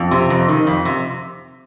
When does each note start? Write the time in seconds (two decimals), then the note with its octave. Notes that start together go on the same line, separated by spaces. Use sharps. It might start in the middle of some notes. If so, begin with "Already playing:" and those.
Already playing: F2
0.11 C3
0.30 F2
0.48 D#3
0.67 F2
0.85 C3